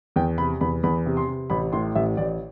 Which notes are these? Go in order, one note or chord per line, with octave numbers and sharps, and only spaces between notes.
E2 G5
C3 B5
E2 B5
E2 B5
C3
C6
C3
A1 B5
A2 C6
A1 E5
A1 D5